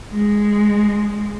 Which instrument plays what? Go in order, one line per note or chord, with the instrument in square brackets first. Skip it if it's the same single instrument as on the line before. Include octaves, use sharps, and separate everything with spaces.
[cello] G#3